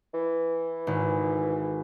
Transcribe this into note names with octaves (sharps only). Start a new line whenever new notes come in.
E3
G#1